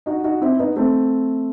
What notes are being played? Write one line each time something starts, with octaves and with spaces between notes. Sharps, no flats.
D#4 F#4
D#4 F#4
C4 E4
B3 D#4
A3 C4